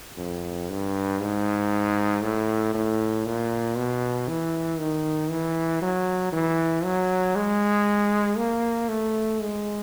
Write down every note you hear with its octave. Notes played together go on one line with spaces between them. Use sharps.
F2
G2
G#2
A2
A2
A#2
B2
E3
D#3
E3
F#3
E3
F#3
G#3
A#3
A3
G#3